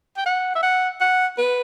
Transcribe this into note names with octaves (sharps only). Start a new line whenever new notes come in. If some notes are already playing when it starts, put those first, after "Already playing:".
G5
F#5
E5
F#5
F#5
B4